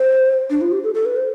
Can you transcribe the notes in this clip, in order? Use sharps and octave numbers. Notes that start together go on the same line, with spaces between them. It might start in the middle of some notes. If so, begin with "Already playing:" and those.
Already playing: C5
D4
F4
G4
A4
A4
B4
C5